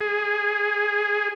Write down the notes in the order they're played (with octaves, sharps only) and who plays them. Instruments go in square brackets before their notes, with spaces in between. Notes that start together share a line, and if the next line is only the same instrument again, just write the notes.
[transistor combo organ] G#4